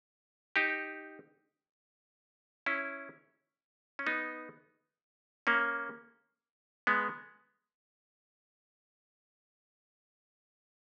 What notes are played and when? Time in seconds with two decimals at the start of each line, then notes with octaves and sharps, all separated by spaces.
0.56 D#4 G4
2.66 C#4 E4
3.99 C#4
4.07 B3 D#4
5.47 A#3 C#4
6.87 G#3 B3